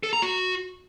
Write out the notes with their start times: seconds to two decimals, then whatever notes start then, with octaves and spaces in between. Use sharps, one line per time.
0.03 A4
0.13 A#5
0.22 F#4